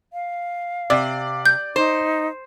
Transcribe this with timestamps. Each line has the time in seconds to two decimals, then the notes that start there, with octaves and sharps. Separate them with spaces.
0.13 F5
0.90 C3 D5
1.46 G6
1.76 D#4 C5